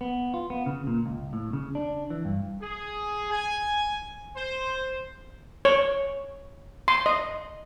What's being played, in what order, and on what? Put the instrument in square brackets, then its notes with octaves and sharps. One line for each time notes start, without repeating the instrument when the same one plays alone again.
[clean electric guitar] B3
F4
B3
C#3
A#2
C#2
A2
C#3
D4
E3
G2
[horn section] G#4
G#5
C5
[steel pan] C#5
C6
D#5